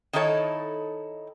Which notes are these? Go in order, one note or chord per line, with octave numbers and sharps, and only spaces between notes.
D#3 D#4 E4 A4 C#5